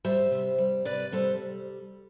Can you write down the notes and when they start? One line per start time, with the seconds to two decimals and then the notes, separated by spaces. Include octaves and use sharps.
0.05 G3 C5 E5
0.31 C3
0.58 G3
0.85 C3 B4 D5
1.12 G3 A4 C5